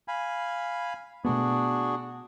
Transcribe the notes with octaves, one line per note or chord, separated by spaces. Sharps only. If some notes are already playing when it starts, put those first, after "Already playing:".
F5 G#5 B5
B2 A3 B3 D4 F#4 G#4